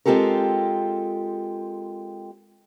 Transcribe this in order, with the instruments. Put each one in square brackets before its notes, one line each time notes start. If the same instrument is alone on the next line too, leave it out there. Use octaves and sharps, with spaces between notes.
[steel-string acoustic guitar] G#3 C4 F4 G4 A4 A#4